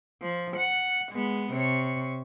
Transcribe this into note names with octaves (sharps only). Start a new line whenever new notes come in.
F3
F#5
G#3 B3
C3 C#5